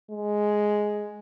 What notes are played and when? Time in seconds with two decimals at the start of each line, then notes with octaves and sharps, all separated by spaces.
0.11 G#3